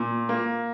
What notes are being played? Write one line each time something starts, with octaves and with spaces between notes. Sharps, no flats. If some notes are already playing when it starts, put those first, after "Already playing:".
Already playing: A#2
A#3